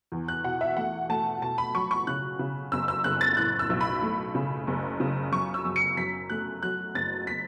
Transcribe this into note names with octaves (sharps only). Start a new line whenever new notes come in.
E2
F#6
B2 F#5
E5
A3 F#5
A3 A5
B2 A5
B5
F#3 C#6
C#6
C#3 F#6
C#3
F#1 E6
E6
F#1 F#6
A6
A2 F#6
E6
B1
B5
A3
C#3
F#1
C#3
F#2 C#6
E6
F#2
C#7
F#2 B6
A3 F#6
F#3 F#6
F#1 A6
B6